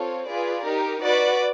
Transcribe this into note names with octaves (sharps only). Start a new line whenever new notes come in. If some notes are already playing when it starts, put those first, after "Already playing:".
Already playing: C4 F4 A4 C#5
F4 G#4 B4 D5
D#4 G4 A#4
F#4 B4 D5